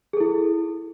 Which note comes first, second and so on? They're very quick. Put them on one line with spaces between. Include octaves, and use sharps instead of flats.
G#4 A4 E4